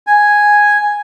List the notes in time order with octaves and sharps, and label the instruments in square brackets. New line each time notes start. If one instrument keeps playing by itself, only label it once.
[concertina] G#5